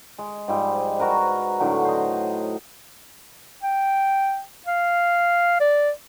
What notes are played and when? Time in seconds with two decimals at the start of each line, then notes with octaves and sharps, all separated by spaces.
0.18 G#3
0.48 G#2 F3 G3 G#3
0.99 F#4 A#4 B4
1.60 A2 D3 F#3
1.84 C5 D#5
3.63 G5
4.66 F5
5.60 D5